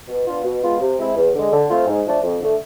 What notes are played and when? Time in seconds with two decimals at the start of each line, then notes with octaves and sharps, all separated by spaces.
0.08 B2
0.27 B3 D4 F4
0.44 B2
0.63 G#3 B3 F4
0.80 C3
0.98 G#3 C4 E4
1.16 E2
1.34 D3 G#3
1.51 D3
1.70 F3 A3 C4 F4
1.87 G#2
2.05 F3 A3 D4
2.23 F2
2.41 D3 A3